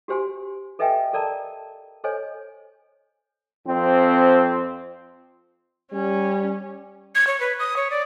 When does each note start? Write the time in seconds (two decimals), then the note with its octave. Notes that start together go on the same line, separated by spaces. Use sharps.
0.08 F#4 G4 C5 G#5 C6
0.79 A4 B4 D#5 E5 G5 G#5
1.13 A4 A#4 D5 A5 A#5
2.04 A4 C5 C#5 D#5 G#5
3.67 F2 C4
5.93 G3 C#4
7.15 G#6
7.27 C#5
7.40 B4
7.59 D#6
7.77 C#5
7.91 D5